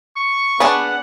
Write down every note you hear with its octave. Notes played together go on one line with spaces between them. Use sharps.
C#6
B3 D4 G#4 B4 F#5